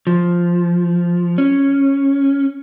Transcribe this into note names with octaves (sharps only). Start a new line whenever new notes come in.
F3
C#4